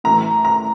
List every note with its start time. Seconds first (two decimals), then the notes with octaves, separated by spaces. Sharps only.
0.04 A2 E3 A3 A#5
0.45 A#5